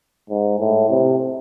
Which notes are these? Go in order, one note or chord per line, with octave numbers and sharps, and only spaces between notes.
G#2
A2
C3